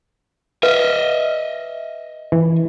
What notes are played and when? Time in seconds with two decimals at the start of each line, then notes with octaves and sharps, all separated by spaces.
0.63 B4 D#5 E5
2.32 E3